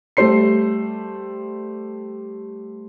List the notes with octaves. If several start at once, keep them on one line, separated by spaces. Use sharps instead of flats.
G3 A3 C5 C6 C7